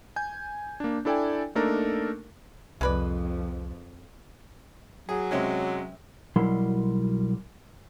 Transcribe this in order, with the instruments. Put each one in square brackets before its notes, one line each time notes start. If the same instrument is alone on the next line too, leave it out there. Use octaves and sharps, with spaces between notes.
[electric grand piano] G#5 G6
A#3 D4
D4 E4 A4 D5 G5 G#5
A3 A#3 D4 D#4 A4 A#4
[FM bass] C2 [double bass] F2 F3 [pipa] G#3 B4 D5
[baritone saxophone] F#3 [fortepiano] G#4
[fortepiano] C3 G#3 C#4
[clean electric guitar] B1 F#3 G3 E4 A#4 C6